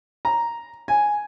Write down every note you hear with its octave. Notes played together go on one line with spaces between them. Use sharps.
A#5
G#5